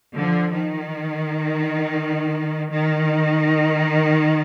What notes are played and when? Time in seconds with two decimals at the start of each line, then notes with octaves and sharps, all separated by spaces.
0.16 D3 F3
0.52 D#3
2.72 D#3